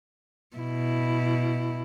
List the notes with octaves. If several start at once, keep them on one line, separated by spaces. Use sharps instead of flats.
B2 E4